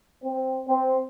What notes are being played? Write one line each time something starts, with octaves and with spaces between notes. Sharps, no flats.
C4
C4